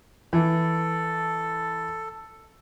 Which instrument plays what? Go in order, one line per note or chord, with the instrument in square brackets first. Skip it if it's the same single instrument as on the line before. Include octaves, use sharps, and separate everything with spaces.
[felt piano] E3 [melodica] A4